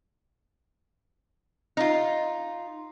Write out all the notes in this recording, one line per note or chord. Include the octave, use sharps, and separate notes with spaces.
D#4 F4